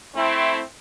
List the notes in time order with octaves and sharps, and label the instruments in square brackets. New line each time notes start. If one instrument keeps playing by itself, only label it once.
[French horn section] A3 C4 E4